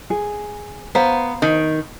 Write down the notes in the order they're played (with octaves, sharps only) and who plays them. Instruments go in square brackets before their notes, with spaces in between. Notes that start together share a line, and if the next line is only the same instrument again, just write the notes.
[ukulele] G#4
[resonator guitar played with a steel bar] B3 [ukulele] C5 F5 A#5
[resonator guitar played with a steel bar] D#3